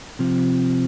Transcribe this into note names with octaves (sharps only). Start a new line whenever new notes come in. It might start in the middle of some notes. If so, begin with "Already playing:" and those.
C3 F3 C4